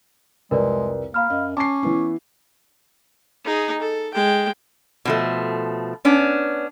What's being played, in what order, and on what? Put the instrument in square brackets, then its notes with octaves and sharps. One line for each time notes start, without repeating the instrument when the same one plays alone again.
[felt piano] C2 F2 [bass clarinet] G#3 [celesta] A#4 B4 D5
[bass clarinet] A#3 [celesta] F5 B5 F6
[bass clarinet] F#2 [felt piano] D#5
[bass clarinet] C#4 [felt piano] A5 C7 [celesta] D6
[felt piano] E3 B3 E4
[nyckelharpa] D#4 G#4
A4
G#3 G5
[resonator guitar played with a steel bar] B2 F3 A3
B3 C#4 D4